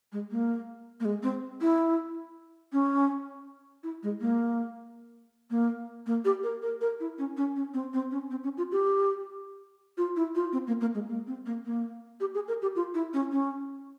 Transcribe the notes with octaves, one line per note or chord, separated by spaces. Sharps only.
G#3
A#3
A#3
G#3
C4
E4
C#4
E4
G#3
A#3
A#3
A#3
G4
A#4
A#4
A#4
E4
C#4
C#4
C#4
C4
C4
C#4
C4
C#4
F4
G4
F4
E4
F4
C4
A#3
A#3
G#3
A#3
C4
A#3
A#3
G4
G#4
A#4
G4
F4
E4
C#4
C#4